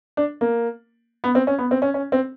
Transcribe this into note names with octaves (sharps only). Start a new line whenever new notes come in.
D4
A#3
B3
C4
C#4
B3
C4
C#4
C#4
C4